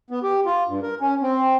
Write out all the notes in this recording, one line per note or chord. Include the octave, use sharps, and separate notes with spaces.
B3
G4
F4
G2
A#4
C#4
C4